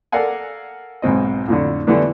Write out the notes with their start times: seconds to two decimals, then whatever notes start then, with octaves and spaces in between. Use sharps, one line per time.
0.12 A4 A#4 D5 F5 F#5 G#5
1.02 B1 G#2 C4 D#5
1.48 F2 A2 D3
1.87 D3 E3 G3 A3 B3 D4